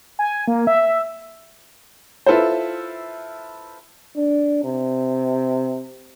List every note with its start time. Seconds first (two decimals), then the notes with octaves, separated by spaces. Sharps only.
0.19 G#5
0.48 A#3
0.67 E5
2.26 E4 F4 A4 B4 C5
4.16 D4
4.64 C3